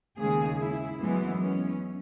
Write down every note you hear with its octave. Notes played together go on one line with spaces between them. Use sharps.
D#2 C#3 G#3 G#4
E4
F#2 E3 G#3 B3
C#4